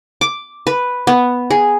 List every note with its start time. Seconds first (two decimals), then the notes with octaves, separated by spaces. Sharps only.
0.21 D6
0.67 B4
1.07 B3
1.50 G#4